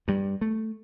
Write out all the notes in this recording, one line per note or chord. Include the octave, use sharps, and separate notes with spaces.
G2 G3
A3